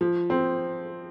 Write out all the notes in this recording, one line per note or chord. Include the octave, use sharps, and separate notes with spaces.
F3
C4